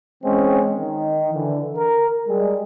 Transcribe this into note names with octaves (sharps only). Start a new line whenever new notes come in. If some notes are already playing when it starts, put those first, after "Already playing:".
E3 G#3 C4 C#4
D#3
D3 E3
A#4
G3 G#3